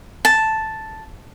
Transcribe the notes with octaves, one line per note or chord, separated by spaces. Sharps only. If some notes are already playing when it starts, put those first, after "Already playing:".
A5